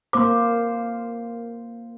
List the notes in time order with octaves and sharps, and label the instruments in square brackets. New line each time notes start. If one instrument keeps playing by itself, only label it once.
[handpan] A#3 C5 [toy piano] D6